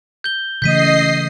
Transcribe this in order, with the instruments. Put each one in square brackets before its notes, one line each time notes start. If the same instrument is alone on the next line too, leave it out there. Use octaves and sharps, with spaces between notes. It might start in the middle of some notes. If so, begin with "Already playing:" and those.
[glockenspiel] G6 G7
[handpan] C#3 E3 A3 [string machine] D#5 C7 [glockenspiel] G6 B6 D#7